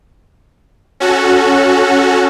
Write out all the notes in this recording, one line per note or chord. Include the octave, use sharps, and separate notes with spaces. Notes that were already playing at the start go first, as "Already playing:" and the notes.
C#4 F#4 A4